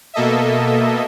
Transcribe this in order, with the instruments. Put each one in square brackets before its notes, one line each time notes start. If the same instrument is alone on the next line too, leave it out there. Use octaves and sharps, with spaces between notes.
[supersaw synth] B2 A#3 A4 D#5 E5